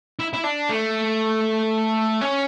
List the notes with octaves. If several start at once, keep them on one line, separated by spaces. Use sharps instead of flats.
E4
E4
D4
A3
C#4